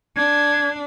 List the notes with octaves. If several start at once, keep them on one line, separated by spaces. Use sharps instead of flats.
D4 G#6